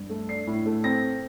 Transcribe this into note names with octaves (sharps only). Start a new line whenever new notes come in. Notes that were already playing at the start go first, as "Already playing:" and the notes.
Already playing: G2
A3
D4 C7
A2
A3
C4 A#6